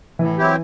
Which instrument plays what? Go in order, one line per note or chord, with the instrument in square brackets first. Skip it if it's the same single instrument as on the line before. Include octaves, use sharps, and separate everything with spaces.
[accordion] A2 [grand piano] E3
[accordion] F#3 C4 E4 G4